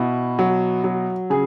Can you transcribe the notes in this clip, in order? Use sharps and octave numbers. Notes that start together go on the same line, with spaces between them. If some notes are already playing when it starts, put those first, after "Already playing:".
Already playing: B2 E4
F#3
F#3
C#3 G#4